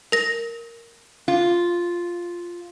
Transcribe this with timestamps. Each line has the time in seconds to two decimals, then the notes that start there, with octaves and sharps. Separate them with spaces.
0.12 A#4 A#6
1.28 F4